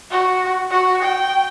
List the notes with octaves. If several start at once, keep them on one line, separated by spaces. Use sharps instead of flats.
F#4
F#4
G5